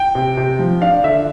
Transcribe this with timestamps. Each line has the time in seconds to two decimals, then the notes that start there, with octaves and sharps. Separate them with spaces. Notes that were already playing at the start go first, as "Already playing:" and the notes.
Already playing: G5
0.15 C3
0.37 C3
0.59 F3
0.81 D4 F5
1.04 D3 E5